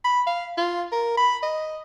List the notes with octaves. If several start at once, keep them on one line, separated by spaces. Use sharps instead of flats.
B5
F5
F4
A#4
B5
D#5